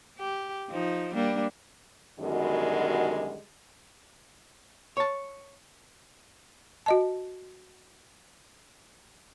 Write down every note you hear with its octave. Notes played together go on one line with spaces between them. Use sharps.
G4
F3 D#4
G3 A#3 D4
F#2 B2 D3 D#3 G3 G#3
C#5 A5
F#4 D#5 A5